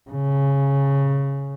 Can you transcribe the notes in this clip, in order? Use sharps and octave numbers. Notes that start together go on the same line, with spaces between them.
C#3